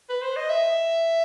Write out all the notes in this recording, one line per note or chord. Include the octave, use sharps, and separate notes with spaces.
B4
C5
D#5
E5